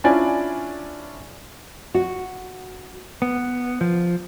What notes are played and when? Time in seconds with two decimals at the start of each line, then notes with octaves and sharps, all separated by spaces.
0.04 C#4 D4 E4 F4 D5 G#5
1.95 F#4
3.22 B3
3.81 F3